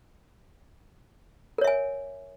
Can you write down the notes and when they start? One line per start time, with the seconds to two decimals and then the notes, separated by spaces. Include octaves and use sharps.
1.58 A#4
1.61 C#5
1.64 E5
1.67 G#5